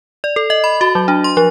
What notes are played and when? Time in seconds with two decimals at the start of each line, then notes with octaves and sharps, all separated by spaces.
0.24 D5
0.36 A4
0.50 D#5
0.64 B5
0.81 F#4
0.95 F#3
1.08 D4
1.24 C6
1.37 F3